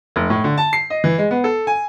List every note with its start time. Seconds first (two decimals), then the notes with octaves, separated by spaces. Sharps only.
0.16 F1
0.30 A2
0.44 D3
0.58 A5
0.73 C7
0.90 D#5
1.04 E3
1.18 G#3
1.31 B3
1.44 A4
1.67 G#5